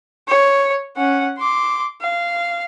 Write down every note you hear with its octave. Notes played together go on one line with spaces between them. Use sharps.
C#5
C#4 F#5
C6 D6
F5